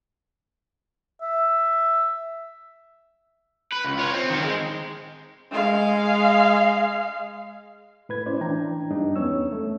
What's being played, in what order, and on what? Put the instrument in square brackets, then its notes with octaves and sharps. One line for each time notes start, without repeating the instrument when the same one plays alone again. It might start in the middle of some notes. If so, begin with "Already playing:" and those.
[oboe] E5
[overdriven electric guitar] B4
C#2
F4 C#5
C4
D#3 C4
G#3
[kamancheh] G#3 F5
[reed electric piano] A2 B4 G#6
C#4 E4 C5 D5
E3 D4 G5 A#5
G2 G3 D4 D#4
E2 B3 C#4 C#5 E6
A3